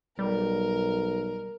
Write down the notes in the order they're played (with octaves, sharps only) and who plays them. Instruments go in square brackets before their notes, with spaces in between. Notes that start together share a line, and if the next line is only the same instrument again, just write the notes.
[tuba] B1 [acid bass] G3 [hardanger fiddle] A#4